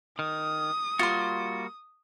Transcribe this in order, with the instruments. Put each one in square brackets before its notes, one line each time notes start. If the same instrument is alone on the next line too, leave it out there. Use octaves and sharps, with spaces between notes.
[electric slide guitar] D#3 [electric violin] D#6
[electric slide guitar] G3 A#3 F#4 [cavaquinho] F4 C6